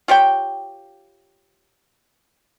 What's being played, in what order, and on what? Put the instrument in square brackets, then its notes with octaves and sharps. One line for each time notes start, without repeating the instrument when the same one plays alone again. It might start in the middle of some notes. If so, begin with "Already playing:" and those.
[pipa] F4 G4 C#5 G5